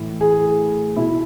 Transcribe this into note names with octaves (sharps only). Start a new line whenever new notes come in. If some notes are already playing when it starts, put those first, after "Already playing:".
Already playing: A2 E3
G#4
B2 E4